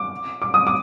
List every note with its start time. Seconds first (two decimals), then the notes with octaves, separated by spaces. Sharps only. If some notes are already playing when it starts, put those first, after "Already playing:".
Already playing: D6
0.42 D6
0.54 D#6
0.67 D6